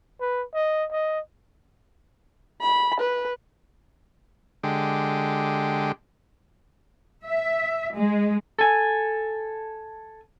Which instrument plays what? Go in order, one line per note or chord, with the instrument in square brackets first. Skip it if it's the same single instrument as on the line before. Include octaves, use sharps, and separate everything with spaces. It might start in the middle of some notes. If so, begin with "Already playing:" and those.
[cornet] B4
D#5
D#5
[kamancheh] B5
B4
[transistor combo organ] D3 G#3 G4
[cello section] E5
G#3
[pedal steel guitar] A4 G#5